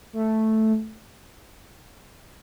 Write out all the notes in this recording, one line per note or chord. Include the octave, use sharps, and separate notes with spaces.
A3